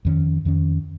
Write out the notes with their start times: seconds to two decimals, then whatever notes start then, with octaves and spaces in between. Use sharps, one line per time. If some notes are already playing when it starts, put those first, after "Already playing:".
0.05 F2 D#3 C#4
0.45 F2 D#3 C#4